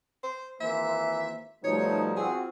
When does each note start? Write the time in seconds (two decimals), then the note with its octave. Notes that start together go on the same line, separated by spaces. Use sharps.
0.23 C5
0.61 G#1 E3 A#3 C5 E5
1.64 B2 F3 G3 A3 D#4 C#5
2.16 C4 F4 F#4 G#4